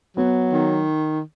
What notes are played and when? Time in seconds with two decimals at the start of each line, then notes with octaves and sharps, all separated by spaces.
0.17 F#3 B3
0.52 D#3